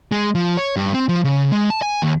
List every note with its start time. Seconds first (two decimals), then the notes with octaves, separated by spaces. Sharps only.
0.12 G#3
0.35 F3
0.57 C#5
0.76 G2
0.94 C4
1.09 F3
1.24 C#3
1.52 G#3
1.70 A5
1.82 G#5
2.02 D#2